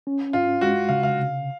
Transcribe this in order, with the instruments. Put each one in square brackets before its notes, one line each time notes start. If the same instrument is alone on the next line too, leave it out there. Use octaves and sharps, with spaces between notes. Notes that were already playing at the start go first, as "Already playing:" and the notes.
[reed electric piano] C#4
[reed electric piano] G#2 [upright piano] F4
[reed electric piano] G#3 [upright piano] F#4
[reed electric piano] C#3 [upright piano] F5
[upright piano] F5
[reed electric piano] C3